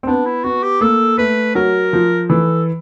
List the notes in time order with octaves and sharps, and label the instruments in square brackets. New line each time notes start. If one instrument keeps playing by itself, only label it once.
[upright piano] C4
[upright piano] B3 [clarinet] D4
[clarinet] E4
[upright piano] B3 [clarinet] F#4
[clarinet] G4
[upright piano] A#3 [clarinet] A4
[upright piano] A3 [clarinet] B4
[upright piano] F#3 [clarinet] A#4
[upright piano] F3
[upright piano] E3 [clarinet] A4